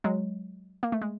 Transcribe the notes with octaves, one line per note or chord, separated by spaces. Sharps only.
F#3 G#3
A#3
A3
G#3